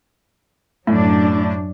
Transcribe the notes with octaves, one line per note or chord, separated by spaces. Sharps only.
F#2 A2 F#3 D4